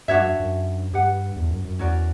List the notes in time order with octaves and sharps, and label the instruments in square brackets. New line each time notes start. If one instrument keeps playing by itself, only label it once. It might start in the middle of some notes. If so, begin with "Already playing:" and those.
[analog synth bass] G2 [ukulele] D4 F#4 C#5 E5
[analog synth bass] F#2
F#2
[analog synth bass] G2 [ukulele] G4 B4 F#5
[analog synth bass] E2
F#2
F#2
[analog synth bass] E2 [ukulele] C#4 F#4 A#4 D5